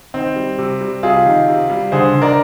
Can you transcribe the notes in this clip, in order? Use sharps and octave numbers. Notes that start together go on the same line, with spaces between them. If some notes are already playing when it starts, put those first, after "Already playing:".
D#3 C4
G3
C3
G3
C3 F4 G#4
D#3
C3
G3
D3 G#4 C5
D3
A#4 D5